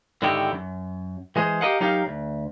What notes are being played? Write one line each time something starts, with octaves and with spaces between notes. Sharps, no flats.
G#2 D3 D#3 E4 F#4 G4
F#2
E3 G#3 G#4 C5
G4 G#4 A#4 D#5 F5 F#5
F#3 D#4 G4 A#4 F5
D2